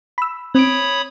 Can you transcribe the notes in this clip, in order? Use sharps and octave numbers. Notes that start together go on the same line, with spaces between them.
B5 E6
C4 C#5 B5 D#6 D7